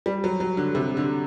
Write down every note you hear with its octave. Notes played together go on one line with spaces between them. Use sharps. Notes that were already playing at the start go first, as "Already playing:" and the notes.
G3
F#3
F#3
D3
C3
D3